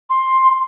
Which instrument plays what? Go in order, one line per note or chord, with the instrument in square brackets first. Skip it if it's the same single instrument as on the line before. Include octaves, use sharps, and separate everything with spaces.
[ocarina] C6